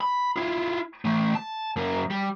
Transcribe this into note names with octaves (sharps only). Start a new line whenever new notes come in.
B5
E4 F4
E3 A3
A5
F#2 A#3
G3